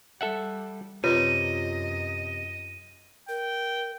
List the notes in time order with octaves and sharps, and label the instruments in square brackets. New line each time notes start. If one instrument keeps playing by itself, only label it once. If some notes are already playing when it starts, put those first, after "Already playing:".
[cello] G3 [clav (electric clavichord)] A4 E5 F#5
[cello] F#2 D#5 [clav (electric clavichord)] C3 [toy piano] F4 B4 C#5 [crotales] D#7
[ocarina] A#4 [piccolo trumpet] G5